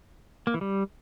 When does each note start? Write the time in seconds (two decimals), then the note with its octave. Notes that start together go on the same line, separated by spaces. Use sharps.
0.47 A#3
0.54 E3
0.61 G3